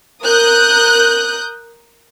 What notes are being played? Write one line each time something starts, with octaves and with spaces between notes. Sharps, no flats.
A#4 D#6 F#6 G6